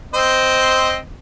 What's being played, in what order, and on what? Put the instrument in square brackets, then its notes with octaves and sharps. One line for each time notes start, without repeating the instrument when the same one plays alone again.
[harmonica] C4 C5 D#5